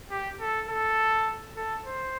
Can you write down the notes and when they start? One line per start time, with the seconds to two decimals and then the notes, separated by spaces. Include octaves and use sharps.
0.11 G4
0.40 A4
0.69 A4
1.56 A4
1.85 C5